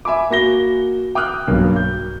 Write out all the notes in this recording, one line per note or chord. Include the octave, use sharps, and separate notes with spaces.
E5 G#5 B5 D6
A#3 F#4 A#6 G7
G5 D6 D#6 F6 F#6
B1 G2 A#3
G6